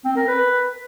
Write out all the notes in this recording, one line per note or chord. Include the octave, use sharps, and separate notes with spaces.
C4
A#4
B4